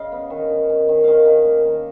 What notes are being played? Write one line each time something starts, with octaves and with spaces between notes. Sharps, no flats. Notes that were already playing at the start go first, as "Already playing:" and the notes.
Already playing: C#3 D#5 F5
B3
D#3
D#3
C#4
D#3
D#3 D#5 F5
D#3
A#3
D#3